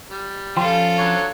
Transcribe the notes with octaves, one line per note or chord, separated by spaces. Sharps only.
G3
F3 C#4 F4 A4 G5 C6
D3 F#3 C#5